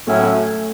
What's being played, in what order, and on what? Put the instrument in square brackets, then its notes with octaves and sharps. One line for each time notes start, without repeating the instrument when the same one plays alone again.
[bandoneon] A2 F#3 C#4 E4 [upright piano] A3